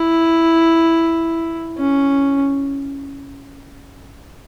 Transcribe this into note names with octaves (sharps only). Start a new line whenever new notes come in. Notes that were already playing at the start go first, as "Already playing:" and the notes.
Already playing: E4
C#4